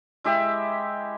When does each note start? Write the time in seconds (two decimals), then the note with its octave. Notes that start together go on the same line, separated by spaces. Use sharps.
0.24 G#3 E4 G4 E5